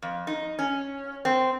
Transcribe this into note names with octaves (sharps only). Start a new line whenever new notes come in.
F2
D#4
C#4
C4